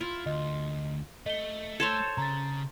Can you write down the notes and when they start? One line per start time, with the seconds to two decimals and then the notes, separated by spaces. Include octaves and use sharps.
0.01 E4 F4
0.26 D2 D#5
1.26 A3 D#5 G7
1.80 A4 C5 C#5 G#6 E7
2.18 C#3 A#5 A6